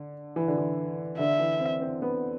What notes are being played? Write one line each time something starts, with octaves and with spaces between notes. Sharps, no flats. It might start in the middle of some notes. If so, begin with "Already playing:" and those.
Already playing: D3
E3
D3
E3
D3 E5
E3
C4
C4
B3